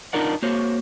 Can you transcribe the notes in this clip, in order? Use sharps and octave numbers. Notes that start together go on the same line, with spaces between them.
D4 D#4 F4 A#4 D5 F#5
A#3 F#4 C5 C#5